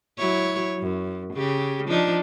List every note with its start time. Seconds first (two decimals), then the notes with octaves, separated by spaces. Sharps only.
0.18 F#3 E4 C#5
0.79 F#2
1.33 C#3 G4
1.87 F3 D4 D#4